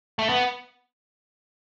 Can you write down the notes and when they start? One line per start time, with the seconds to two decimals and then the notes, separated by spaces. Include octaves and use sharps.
0.19 A3
0.29 B3